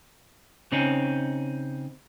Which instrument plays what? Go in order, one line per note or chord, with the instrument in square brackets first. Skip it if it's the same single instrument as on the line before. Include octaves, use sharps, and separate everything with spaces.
[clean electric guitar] C#3 C4 C#4 D#4